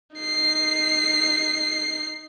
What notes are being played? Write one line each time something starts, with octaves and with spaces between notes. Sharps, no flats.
D#4 C7